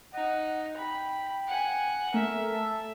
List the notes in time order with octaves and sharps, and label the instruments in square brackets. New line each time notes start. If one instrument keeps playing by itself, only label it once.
[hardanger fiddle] D#4 [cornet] F#5
[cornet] G5 [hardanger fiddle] B5
[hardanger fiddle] F#5 G#5
[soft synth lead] A3 [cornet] A#4 [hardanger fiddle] E5
[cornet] A4